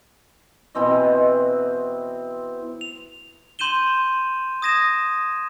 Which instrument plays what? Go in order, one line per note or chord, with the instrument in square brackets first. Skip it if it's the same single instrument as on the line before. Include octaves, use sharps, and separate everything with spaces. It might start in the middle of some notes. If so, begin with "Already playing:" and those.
[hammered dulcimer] B2 E3 C4 D#5
[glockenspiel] F7
C6 G6 D#7 E7 G7
D#6 G#6 A#6 D#7 E7